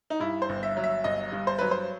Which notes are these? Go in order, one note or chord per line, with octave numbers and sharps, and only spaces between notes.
D#4
G2 E4
C5
G1
E5
F#3
E5
G1 D#5
G2
C5
F#3 B4
C5